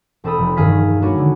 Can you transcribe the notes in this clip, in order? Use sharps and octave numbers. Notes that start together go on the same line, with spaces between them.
E1 C4 A4 B5 D#6
F1
E1 G2 D#3 G#4 F5 B6
G#3 B3 D4 F#4 G#4 C#5
D3